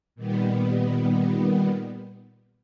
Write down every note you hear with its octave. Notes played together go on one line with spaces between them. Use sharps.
A#2 D#3 G3 B3